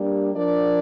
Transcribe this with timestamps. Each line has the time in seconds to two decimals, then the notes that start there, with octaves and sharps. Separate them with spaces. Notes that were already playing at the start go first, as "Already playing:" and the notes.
Already playing: G3 A#3 D4 G4
0.34 F3 D4 A#4 D5